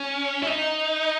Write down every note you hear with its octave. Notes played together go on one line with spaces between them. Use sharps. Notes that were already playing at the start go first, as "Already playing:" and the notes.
Already playing: C#4
E4
D#4